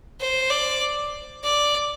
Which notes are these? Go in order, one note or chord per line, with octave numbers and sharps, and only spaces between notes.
C5
D5
D5